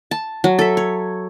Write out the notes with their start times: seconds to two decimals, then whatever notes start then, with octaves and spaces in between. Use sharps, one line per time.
0.11 A5
0.44 F#3
0.59 A4 E5
0.77 C#5